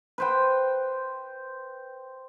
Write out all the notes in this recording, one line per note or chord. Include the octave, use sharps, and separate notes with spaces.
B4 C5 G5